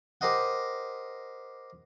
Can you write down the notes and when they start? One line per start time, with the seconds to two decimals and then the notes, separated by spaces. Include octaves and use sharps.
0.21 G4 A#4 C5 D#5 F#5